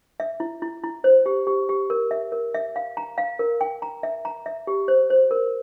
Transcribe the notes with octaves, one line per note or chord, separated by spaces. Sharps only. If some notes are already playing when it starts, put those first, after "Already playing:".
E5
E4
E4
E4
C5
G4
G4
G4
A#4
E5
A#4
E5
F5
A#5
F5
A#4
G5
A#5
E5
A#5
E5
G4
C5
C5
A#4